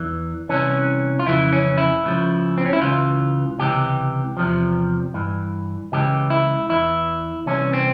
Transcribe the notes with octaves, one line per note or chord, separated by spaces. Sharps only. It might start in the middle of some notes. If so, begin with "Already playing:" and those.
Already playing: E2 E3
C2 C3 E3 C#4
F4
F2 C#3 E3 E4
C#4
E4
C#2 C#3 F3
C4
C#4
E4
C#2 C#3 E3 F4
C#2 C3 E3 G4
E2 C3 F3
G2 E3
C#2 C#3 E3 G4
E4
E2 E3 E4
C2 C3 E3 C#4
C4